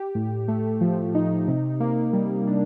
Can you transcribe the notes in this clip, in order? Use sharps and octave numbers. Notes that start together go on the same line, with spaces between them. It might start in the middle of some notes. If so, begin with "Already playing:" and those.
Already playing: G4
A2
A3
F3
D#4
C3
A#3
G3
D4